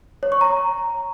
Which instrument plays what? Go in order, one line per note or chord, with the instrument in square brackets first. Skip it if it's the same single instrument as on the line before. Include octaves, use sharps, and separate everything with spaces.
[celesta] C#5
C#6
A#5